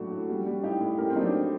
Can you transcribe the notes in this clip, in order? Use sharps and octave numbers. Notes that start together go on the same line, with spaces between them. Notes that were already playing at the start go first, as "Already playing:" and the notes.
Already playing: A2 F#3 A3 D4 F#4
A2
G3
G3
A2 D#4 G4
A2
A2 G4 A#4
C4
F#3 D#4
D4
A3